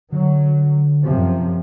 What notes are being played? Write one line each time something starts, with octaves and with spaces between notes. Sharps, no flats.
D3 F#3
F#2 C3 F3